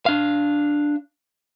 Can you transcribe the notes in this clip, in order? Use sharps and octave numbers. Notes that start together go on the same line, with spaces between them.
D4 F5